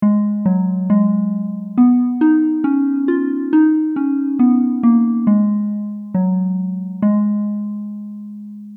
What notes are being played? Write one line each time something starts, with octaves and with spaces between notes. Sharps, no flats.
G#3
F#3
G#3
B3
D#4
C#4
F4
D#4
C#4
B3
A#3
G#3
F#3
G#3